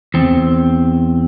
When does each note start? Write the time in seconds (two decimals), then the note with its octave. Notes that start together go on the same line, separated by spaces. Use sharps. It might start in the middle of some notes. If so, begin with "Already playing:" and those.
0.14 E2 C4